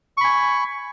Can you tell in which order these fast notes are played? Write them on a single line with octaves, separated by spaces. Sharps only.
C#6 B5 G#5